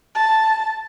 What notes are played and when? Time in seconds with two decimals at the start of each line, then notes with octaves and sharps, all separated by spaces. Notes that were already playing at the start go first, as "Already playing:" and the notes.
0.15 A5